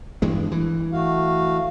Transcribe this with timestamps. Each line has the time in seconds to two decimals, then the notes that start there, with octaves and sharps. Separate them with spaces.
0.22 G2 E3 G#3
0.52 E3
0.93 A3 F#4 F5